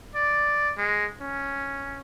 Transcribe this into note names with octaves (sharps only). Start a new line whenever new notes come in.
D5
G#3
C#4